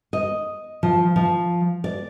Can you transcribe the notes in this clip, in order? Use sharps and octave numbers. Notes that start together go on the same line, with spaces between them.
D#5
F3
F3
D5